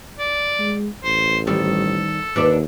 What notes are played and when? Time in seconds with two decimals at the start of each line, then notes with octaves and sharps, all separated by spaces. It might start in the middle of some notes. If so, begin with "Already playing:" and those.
0.18 D5
0.59 G#3
1.04 A1 C5
1.47 D#3 G3 A4 C5
2.36 D#2 D4 B4 D5